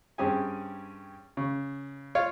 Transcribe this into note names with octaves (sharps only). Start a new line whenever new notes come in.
G2 C4 C#4 G4 G#4 G#5
C#3
F4 C#5 F5